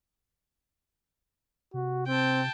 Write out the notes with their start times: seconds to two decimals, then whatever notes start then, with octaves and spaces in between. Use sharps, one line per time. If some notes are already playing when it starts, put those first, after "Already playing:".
1.74 C3 F#4
2.07 C4 G5 A5